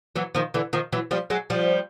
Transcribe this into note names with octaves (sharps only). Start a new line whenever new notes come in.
E3 F#3
D#3 F3
D3 E3
D#3 F3
E3 F#3
F3 G3
F#3 G#3
F3 G3